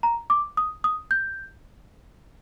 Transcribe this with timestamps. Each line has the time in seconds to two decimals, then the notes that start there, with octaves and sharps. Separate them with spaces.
0.03 A#5
0.30 D6
0.57 D#6
0.84 D#6
1.11 G6